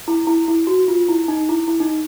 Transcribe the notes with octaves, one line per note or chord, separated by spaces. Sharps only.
E4
E4
E4
F#4
F4
E4
D#4
E4
E4
D#4